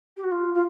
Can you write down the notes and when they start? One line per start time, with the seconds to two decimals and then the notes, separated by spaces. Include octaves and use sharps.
0.17 G4
0.23 F#4
0.31 F4
0.54 F4